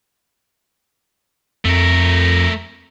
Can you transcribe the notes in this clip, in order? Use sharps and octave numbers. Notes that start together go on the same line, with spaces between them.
F2 A3 A#4